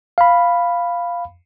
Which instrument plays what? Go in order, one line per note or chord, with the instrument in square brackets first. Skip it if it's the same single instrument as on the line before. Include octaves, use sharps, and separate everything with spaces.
[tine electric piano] F5 B5